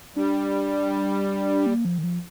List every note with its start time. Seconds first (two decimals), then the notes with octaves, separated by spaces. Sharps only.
0.16 G3 D4
1.66 A#3
1.85 F3
1.98 D#3
2.03 F3